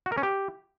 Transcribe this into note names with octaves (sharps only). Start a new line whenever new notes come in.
F#4
A#4
C#4
G4